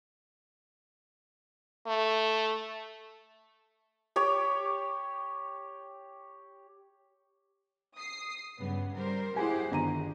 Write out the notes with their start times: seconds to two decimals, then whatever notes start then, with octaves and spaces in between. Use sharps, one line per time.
1.87 A3
4.16 G4 C#5 D6
7.96 D#6 C7
8.59 G2 C#3 B3
8.95 G3 A#4 C5
9.36 E4 G4 G#4 C5 F#5 G#5
9.71 G1 D#3 A#5 D#7